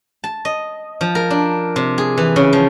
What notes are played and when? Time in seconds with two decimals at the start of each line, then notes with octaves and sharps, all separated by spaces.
0.24 A5
0.45 D#5
1.01 F3
1.15 A#4
1.30 D4
1.76 C3
1.98 G#4
2.17 E3
2.36 C#3
2.53 F3